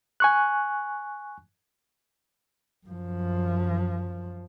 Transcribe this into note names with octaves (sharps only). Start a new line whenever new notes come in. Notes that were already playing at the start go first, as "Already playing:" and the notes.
G#5 C#6 F#6
F#2 F3